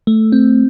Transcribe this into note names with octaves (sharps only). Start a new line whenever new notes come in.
A3
C4